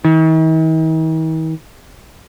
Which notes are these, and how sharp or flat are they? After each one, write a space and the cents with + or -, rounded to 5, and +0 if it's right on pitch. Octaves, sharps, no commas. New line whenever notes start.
D#3 +45